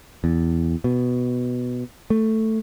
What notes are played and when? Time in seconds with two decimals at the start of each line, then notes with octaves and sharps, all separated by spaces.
0.24 E2
0.84 B2
2.10 A3